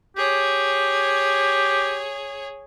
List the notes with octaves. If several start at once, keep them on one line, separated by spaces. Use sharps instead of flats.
G4 G#4 C#5